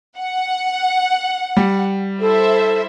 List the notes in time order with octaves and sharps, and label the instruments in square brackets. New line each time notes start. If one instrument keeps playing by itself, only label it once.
[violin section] F#5
[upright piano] G3
[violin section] E4 C5 E5 [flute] A4